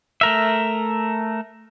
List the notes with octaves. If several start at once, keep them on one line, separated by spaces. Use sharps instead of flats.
A3 A#4 E5